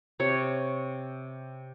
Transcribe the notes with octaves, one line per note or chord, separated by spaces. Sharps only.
C3 C#5